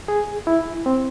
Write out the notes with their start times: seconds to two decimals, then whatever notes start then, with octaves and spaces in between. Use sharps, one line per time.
0.08 G#4
0.47 E4
0.86 C4